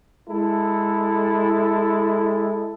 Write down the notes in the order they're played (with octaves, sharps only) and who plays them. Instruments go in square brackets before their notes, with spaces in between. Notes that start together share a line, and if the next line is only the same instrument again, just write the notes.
[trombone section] G#3 E4 A4